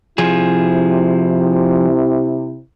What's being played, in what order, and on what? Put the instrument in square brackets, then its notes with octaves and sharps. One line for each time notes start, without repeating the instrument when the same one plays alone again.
[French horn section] C3 E4 [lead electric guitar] F3 G#4